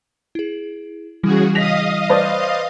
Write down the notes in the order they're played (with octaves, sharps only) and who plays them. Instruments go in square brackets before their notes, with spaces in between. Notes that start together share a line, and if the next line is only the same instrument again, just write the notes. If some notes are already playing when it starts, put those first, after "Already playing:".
[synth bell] E4 G#4
[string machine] C#3 F#4 G#4 [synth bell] E3 G3 E4
[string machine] D#5 F5 D#6 [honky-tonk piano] A#6 B6 F7
[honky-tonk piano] B4 C5 D5